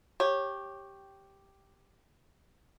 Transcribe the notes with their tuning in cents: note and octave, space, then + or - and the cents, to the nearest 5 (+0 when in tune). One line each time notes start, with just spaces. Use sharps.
G4 +0 C#5 -20